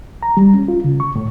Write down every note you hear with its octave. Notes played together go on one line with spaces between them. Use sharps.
A#5
G3
C#4
F4
C#3
C#6
A2